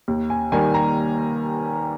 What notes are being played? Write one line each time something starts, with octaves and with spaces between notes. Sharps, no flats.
D#2
G#5
D#3 G3 A#3 G#5
A#5